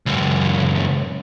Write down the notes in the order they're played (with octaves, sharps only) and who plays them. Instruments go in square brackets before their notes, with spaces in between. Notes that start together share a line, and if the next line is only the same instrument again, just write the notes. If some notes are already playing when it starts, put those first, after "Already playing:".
[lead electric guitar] C#2 F#2